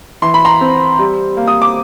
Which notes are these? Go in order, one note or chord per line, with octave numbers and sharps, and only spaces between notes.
E3 C6
B5
A#5 C6
C4
G3
A#3
D#6
D6